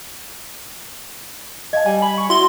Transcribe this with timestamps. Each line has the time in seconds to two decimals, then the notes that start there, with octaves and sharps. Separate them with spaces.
1.73 D#5 F5 A5 G#6
1.86 G3 G#5
2.02 B5 F#7
2.18 C#6
2.30 E4 F#4 C6